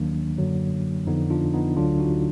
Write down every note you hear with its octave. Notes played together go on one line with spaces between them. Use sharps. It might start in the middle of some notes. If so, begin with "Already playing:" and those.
Already playing: D#2 D#3 F#3 A#3 D4
F#2 D3 F#3
F2 D3 F3 B3 D#4
D4 F4
B3 D#4
D2 D3 F#3 D4 F4
D#4 F#4